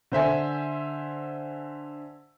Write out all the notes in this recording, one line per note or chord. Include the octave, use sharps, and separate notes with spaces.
D3 C5 E5 G#5